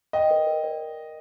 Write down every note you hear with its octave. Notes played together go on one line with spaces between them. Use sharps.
D#5 G5
A#4
A#4
D5